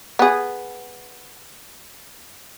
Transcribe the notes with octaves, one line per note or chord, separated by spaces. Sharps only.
B3 G#4